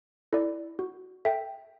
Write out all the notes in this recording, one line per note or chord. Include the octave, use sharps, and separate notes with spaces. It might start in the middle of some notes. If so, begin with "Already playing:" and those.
E4 A4 D5
F#4
A4 E5 G5